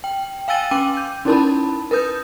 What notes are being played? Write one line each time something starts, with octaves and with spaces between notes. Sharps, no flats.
G5
F5 G5 G#5 E6 A6 D#7
C#4 G5 D6 E6 D#7
G6
C#4 D#4 E4 A#4 A5 B5
A#4 B4 D#6 G6